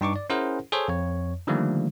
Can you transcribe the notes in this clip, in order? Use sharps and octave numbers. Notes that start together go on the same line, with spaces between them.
G2 D#4 C#6 D6
D5
C#4 E4 G#4 A#4 C5 F#5
G#4 A4 C5 C#5
F2 C#5
D3 D#3 F3 G3 A3 A#3